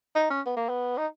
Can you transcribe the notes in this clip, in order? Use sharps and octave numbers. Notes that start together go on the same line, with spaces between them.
D#4
C#4
B3
A#3
B3
D#4